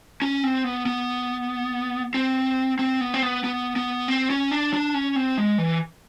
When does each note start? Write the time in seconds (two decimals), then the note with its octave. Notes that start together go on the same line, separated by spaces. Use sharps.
0.22 C#4
0.43 C4
0.64 B3
0.86 B3
2.14 C4
2.79 C4
3.01 B3
3.14 C4
3.23 B3
3.44 B3
3.76 B3
4.08 C4
4.30 C#4
4.51 D4
4.73 D4
4.94 C#4
5.16 C4
5.38 G#3
5.58 E3